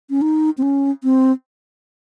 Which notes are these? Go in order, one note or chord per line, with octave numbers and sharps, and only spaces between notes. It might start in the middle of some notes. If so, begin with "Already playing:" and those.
C#4
D#4
C4
C#4
C4